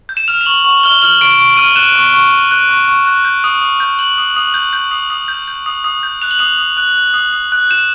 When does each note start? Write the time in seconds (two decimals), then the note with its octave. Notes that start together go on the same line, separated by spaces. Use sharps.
0.09 G6
0.17 E7
0.28 F6 F7
0.41 F7
0.46 C#6 F#7
0.64 C#6 F#7
0.83 F6 G7
1.02 F6 F#7
1.21 C#6 D7
1.39 C#6 D7
1.57 F6 D#7
1.76 F#6 E7
1.95 C#6
2.13 C#6
2.31 F#6
2.51 F#6
2.69 C#6
2.88 C#6
3.06 F#6
3.25 G6
3.44 D#6
3.61 D#6
3.80 G6
3.99 G6 F#7
4.18 D#6
4.36 D#6
4.54 G6
4.73 G6
4.91 D#6
5.10 D#6
5.28 G6
5.48 G6
5.66 D#6
5.84 D#6
6.03 G6
6.22 F#6 F7
6.31 F#7
6.39 D#6 F7
6.58 D#6
6.77 F#6
6.96 F#6
7.14 D#6
7.33 D#6
7.52 F#6
7.69 G6 E7